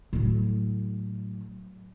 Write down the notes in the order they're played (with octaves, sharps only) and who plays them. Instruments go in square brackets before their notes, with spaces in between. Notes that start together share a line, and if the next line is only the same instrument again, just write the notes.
[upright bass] A2 F#3